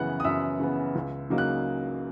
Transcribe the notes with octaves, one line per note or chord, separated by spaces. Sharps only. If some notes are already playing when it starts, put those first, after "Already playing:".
Already playing: F#2 C#3 E3 B3 F#5 F#6
D#6
F#2 E5 E6
C#3 E3 B3
C#2
C#3 F#3 A#3 D#4
F#6